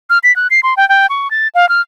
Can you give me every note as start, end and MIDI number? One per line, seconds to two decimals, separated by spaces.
0.10 0.18 89
0.24 0.35 95
0.36 0.47 90
0.51 0.60 96
0.63 0.74 84
0.77 0.87 79
0.89 1.06 79
1.10 1.30 85
1.31 1.48 93
1.55 1.68 77
1.69 1.81 89